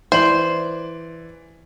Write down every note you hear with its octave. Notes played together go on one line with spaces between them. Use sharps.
E3 C5 D5 F#7